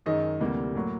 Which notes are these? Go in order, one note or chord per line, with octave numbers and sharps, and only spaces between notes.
F#2 D#3 G#3 D#5
D2 C3 E3 G3 A#3
A2 F#3 A#3